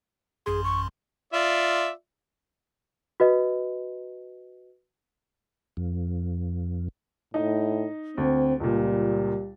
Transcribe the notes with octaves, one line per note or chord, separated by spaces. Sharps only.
A1 F#2 G#4 C6
C#6
F4 D5 E5
F#4 B4 D#5
F2
A2 D#4 D#5
D2 C4
C#2 A#2 G3